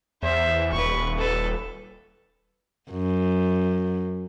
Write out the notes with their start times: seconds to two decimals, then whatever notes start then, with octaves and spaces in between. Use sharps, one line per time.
0.23 E2 C5 E5
0.72 D#1 B4 C#6
1.18 A4 B4
2.91 F#2